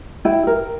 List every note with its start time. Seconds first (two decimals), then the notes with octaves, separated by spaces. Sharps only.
0.25 E4 G5
0.47 A#4